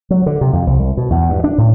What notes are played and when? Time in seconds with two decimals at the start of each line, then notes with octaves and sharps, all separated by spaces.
0.10 F#3
0.26 D3
0.41 C3
0.53 F2
0.67 C2
0.79 C2
0.97 B2
1.10 E2
1.29 G2
1.44 D4
1.58 A2